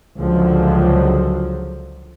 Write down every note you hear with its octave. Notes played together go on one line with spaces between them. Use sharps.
C#2 D3 F3 F#3